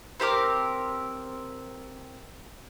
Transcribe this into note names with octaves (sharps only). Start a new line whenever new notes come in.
C4 G4 A#4 D6